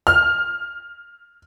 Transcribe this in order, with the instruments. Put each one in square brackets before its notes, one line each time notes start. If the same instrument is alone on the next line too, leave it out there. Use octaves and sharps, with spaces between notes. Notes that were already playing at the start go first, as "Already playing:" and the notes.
[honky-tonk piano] F6